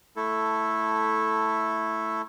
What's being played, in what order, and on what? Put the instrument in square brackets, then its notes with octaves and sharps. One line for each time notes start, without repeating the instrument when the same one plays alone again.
[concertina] A3 E4 A4